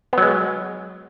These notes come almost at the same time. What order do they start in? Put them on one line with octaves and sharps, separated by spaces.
B3 F#3 G#3